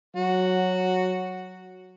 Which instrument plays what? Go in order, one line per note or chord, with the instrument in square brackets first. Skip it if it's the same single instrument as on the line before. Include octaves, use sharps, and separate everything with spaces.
[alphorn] F#3 [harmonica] F#4